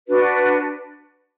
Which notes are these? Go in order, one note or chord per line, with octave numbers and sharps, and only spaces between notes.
D4 F#4 B4